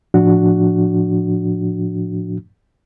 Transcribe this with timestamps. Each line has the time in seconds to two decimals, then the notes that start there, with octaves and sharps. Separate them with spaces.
0.14 A2 F3 D4 F#4